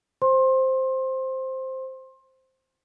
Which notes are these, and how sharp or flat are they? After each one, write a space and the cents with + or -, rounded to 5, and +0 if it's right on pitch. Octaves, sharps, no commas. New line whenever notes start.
C5 +0 C6 +25